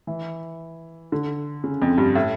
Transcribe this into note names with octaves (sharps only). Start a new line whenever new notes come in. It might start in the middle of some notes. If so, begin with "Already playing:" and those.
E3
D3
C#3
F2
G2
A2